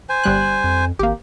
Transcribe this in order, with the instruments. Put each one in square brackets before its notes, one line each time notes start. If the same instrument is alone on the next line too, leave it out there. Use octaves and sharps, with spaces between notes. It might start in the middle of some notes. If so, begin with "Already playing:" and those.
[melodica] C5 G#5
[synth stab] G1 G3 F#6
[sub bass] F2
[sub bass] G#1 [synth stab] A#3 G4